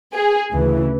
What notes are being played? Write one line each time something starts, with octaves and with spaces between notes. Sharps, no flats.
G#4
D2 C#3 E3